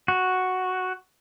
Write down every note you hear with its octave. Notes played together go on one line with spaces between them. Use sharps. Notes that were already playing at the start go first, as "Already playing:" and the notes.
F#4